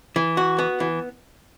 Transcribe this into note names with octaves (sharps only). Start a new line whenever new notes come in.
E3
F#4
B3
E3